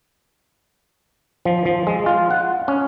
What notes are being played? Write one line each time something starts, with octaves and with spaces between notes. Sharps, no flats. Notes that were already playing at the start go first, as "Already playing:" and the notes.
F3
F3
G#3
F4
F#5
C#4